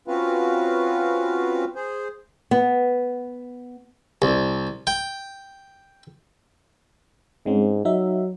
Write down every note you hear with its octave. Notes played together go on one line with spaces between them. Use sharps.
C4 C#4 F4 F#4 B4 F5
G#4 C5
B3
C2
G5
G#2 G#3 C4 C#4
F#3 D#4 E5